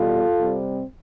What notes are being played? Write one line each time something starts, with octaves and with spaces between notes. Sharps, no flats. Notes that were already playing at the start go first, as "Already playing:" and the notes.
Already playing: E2 B2 G3 B3 F4 A4
C3 G3 C4